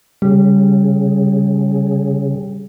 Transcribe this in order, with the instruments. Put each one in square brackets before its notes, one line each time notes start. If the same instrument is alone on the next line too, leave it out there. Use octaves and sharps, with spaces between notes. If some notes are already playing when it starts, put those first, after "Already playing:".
[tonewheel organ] C#3 [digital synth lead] G3